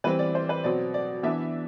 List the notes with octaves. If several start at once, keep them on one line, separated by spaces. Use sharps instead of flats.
E3 G3 C4 B4
D5
C5
B4
B2 F#3 C4 D5
D5
E3 B3 D4 E5